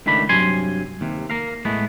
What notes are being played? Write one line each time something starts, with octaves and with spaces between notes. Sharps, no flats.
C#2 D#3 A3 D4 B5
G2 C3 F#3 G#5 C6
D#2 C3
A#3 A#4 F5
A2 G#3 A3 B3